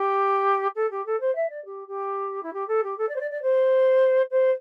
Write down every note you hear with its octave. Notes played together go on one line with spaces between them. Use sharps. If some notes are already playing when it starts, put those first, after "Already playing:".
Already playing: G4
A4
G4
A4
C5
E5
D5
G4
G4
E4
G4
A4
G4
A4
D5
C5
D5
D5
C5
C5